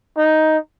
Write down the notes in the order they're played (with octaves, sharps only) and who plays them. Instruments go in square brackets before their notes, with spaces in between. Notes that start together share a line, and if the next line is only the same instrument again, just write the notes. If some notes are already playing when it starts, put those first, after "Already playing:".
[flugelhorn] D#4